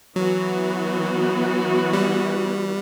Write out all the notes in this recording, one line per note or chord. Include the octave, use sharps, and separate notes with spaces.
E3 F#3 B3 F#4
G3